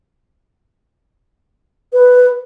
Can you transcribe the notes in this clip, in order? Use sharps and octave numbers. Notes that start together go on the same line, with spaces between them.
B4